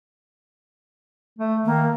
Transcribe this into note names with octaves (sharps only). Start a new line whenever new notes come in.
A3
D#3 A#3